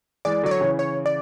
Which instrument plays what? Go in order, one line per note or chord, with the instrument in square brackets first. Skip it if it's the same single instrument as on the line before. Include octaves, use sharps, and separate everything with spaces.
[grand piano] E3 G#3 [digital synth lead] D5
[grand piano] D3 F#3 [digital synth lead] D5
[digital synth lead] C#5
[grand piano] C#3 E3
[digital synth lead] C#5
D5